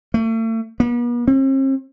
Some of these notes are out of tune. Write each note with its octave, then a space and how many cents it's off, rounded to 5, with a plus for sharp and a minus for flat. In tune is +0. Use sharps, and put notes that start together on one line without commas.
A3 +40
B3 -45
C4 +45